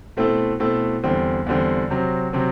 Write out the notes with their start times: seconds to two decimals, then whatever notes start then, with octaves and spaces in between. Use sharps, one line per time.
0.17 B2 A3 C4 E4 A4
0.60 B2 A3 C4 E4 A4
1.04 E2 D3 G3 C4
1.46 E2 D3 G3 C4
1.90 C3 F#3 C4
2.33 C3 F#3 C4